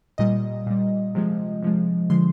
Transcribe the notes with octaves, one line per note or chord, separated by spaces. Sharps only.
A#2 G3 D#5
A#2 G3
C3 F3 G#3
C3 F3 G#3
D3 F3 G#3 C6